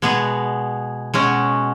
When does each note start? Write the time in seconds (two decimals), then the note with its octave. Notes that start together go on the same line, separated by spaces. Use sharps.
0.02 B2 G#3 B3 G#4
1.14 B2 G#3 C#4 F#4